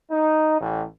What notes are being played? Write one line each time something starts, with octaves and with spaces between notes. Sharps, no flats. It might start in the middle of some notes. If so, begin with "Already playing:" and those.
D#4
A1